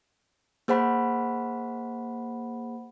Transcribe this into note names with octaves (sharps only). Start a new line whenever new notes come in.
A#3 G#4 C5 F#5 B5